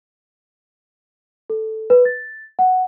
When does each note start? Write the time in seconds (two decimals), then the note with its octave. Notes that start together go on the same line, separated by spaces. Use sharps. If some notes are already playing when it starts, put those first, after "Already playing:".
1.50 A4
1.90 B4
2.05 A6
2.59 F#5